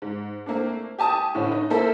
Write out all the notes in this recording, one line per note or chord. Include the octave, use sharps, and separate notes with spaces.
G#2
A3 A#3 C4 D4
G4 G#5 A5 D#6
A2 D3 E3 C#4
D#4
A#3 E4 A4 A#4 C5 E5